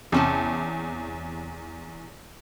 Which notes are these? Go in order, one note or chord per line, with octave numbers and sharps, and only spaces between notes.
E2 C3 C#4 A5